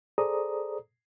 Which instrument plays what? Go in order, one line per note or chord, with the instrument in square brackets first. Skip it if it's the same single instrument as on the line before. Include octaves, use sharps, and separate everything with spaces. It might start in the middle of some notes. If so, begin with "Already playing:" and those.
[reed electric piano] G#4 A4 C5 D5 A#5 D#6